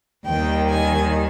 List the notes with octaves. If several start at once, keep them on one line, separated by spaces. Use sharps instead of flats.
D#2 D#3 G3 G5
G#5